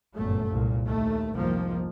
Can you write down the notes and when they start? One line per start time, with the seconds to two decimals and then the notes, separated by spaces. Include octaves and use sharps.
0.16 G1 F#2 A#2 A3
0.52 C2 A#2
0.87 D#2 A3
1.33 F1 C2 G#2 D#3 F3 A#3